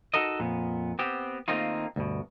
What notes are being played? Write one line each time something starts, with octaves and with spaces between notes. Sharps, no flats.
D#4 F#4 A4 A#4 D#5
F2 A#2 B3
B3 C4 G4
D#3 A3 A#3 C4 D#4 F4
D2 G2 B2